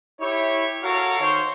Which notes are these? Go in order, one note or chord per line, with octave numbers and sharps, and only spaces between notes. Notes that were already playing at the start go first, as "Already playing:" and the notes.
E4 G4 C#5
F#4 A4 A#4 C#5 F5
D#3 C5 C#5